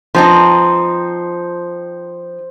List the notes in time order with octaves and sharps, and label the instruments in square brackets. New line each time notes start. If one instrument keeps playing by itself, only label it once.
[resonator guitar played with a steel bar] F3 C4 D#4 [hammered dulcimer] C5